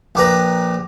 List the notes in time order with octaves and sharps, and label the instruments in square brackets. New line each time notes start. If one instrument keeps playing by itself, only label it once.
[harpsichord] A#1 G4 B4 A#5